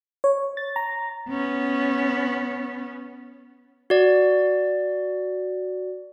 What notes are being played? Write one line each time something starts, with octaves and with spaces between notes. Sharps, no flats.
C#5
A6
A#5
B3 C#4
F#4 D5